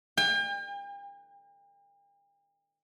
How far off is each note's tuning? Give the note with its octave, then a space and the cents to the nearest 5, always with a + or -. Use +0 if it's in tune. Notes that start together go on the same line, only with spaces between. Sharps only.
G5 +40